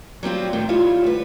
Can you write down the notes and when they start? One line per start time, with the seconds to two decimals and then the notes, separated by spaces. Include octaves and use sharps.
0.23 F#3 G3 C4 F4
0.53 F2 A2 D#3 C4
0.69 G3 E4 F4 C#5
1.04 D2 B4